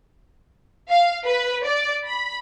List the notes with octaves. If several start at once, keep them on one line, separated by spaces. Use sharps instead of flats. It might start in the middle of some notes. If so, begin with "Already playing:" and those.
F5
B4
D5
B5